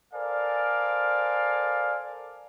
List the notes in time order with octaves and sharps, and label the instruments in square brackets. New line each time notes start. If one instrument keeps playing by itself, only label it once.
[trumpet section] A4 A#4 C5 D5 F5 G#5